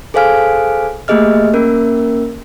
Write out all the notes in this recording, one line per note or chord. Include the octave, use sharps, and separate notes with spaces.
G#4 A4 C5 F5 G#5 F6
A3 A#3 G4 G#4 D#5 F6
A#3 C#4 A#4